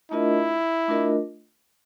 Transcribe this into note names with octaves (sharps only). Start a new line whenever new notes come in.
A3 D4 E4 F4 A#4 D#5
A3 D4 F4 A#4 D#5